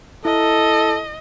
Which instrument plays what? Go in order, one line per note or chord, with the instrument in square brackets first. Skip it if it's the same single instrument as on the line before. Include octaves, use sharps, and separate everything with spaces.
[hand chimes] E4 [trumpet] A4 [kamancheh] D#5